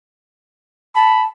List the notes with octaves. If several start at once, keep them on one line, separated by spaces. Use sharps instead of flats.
A5 B5